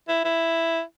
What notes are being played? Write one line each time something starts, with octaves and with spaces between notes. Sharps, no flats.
E4
E4